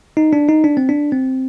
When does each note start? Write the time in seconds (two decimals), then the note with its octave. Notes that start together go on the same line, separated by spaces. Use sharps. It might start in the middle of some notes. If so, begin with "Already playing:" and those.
0.17 D#4
0.33 D4
0.49 D#4
0.64 D4
0.77 C4
0.89 D4
1.12 C4